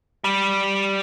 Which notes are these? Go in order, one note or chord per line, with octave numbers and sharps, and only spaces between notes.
G3